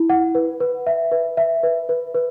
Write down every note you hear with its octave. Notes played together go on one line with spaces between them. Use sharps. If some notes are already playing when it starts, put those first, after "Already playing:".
Already playing: E4
F#5
B4
B4
E5
B4
E5
B4
B4
B4